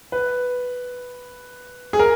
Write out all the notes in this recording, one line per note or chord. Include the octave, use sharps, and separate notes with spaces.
B4
G#4
A#4